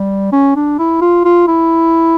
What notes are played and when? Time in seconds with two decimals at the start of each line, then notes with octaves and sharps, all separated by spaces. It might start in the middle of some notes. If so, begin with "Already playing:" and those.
Already playing: G3
0.33 C#4
0.56 D4
0.79 E4
1.02 F4
1.25 F4
1.48 E4